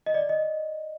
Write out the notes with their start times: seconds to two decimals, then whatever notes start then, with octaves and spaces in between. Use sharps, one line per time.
0.06 D#5
0.14 D5
0.29 D#5